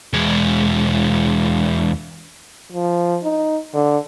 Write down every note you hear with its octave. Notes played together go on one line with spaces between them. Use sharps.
E2 G#3
F3
D#4
D3